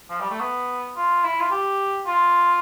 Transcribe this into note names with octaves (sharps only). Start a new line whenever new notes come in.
F3
G3
A3
B3
F4
E4
F4
G4
F4